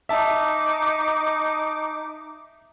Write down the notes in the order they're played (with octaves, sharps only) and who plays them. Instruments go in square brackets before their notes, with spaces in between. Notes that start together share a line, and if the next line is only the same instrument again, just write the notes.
[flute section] D#4 D6 [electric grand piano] E5 A5